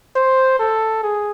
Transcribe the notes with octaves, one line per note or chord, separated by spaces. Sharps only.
C5
A4
G#4